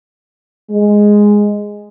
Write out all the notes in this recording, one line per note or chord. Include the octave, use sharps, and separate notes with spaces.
G#3